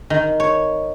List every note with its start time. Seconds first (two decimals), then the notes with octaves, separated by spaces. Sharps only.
0.10 D#3
0.40 C#5